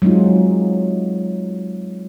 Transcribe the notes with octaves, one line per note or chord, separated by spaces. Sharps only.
F#3 G#3 C4 D#4 F4